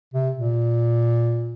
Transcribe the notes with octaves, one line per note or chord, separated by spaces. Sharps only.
C3
A#2